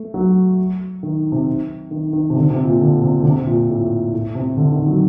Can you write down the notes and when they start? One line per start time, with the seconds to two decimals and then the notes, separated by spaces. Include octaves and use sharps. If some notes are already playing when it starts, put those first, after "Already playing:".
Already playing: A3
0.14 F#3
1.03 D#3
1.32 C3
1.91 D#3
2.13 D#3
2.30 C3
2.36 D3
2.50 C3
2.65 A#2
2.80 D3
3.02 C3
3.20 D3
3.25 C3
3.47 A#2
3.69 A2
4.13 A2
4.35 C3
4.57 D3
4.72 D#3
4.87 F#3